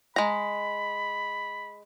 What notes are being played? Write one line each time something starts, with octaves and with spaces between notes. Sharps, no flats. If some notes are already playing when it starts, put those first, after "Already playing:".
G#3 A#5 B5